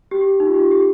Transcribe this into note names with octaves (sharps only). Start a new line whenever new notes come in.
G4
D#4
F4
G4
F4
G4